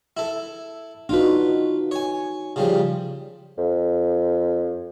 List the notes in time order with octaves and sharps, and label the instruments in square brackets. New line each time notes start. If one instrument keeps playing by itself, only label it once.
[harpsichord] E4 A4
[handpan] D4 D#4 F#4 [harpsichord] F4 B4
[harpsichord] C#5 G#5
C#3 F3 G3
[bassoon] F2